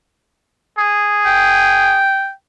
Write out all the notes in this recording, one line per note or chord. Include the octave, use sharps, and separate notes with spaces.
G#4
G5